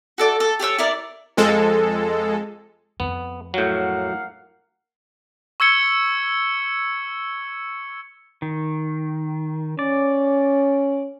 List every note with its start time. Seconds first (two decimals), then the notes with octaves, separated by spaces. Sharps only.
0.18 F#4 A4 D5
0.40 A4
0.60 G4 A4 C#5 E6
0.78 E4 A#4 D5
1.37 F2 G#3 A4
3.00 F2 B3
3.54 A2 F#3 A#3 F5 F#5
5.60 C#6 E6 G#6 C#7 G7
8.42 D#3
9.79 C#4 D5